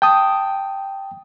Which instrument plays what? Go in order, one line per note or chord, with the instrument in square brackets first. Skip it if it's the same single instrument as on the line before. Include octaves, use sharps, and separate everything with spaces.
[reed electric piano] G5 A5 D#6